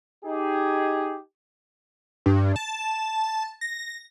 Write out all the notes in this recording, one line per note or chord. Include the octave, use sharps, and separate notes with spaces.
D#4 G4 G#4
G2
A5
A#6